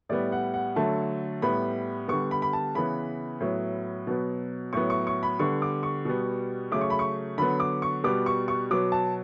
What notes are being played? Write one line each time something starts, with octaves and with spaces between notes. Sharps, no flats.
A2 G3 B3 D5
F#5
F#5
D3 F#3 A3 A5
A2 G3 B3 B5
D3 G3 B3 C#6
B5
B5
A5
C#3 E3 B3 B5
A2 F#3 B3
B2 F#3 B3
A2 F#3 B3 C#6
C#6
C#6
B5
D3 G3 B3 C#6
D6
C#6
B2 G3 B3
C#3 F#3 A3 D6
C#6
B5
C#6
D3 F#3 B3 B5
D6
C#6
B2 G3 B3 D6
C#6
C#6
B2 F#3 B3 D6
A5